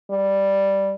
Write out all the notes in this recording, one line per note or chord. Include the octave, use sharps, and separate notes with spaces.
G3